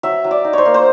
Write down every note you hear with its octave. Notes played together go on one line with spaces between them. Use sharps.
F#3 E5
F#3
D5
D#4
C5 C#5
A#3
C5